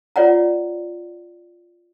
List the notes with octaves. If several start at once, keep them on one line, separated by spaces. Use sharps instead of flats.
F4 C#5 D5 F#5 A#5